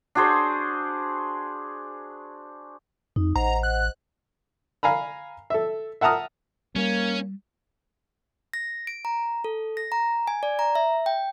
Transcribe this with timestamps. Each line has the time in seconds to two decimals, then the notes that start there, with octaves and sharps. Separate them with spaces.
0.15 D4 F#4 G#4 C5
3.16 F2 D#4
3.36 A1 C5 D#5 F#5 A#5
3.63 F#6
4.83 F5 G#5 A#5 B5
5.50 A4 E5
6.01 E5 F#5 A5 A#5 D#6 F6
6.76 G3 A#3 C#4
8.53 A#6
8.87 D7
9.05 A#5
9.44 A4
9.77 A#6
9.92 A#5
10.28 G#5
10.43 D5
10.59 A#5
10.75 E5
11.06 G5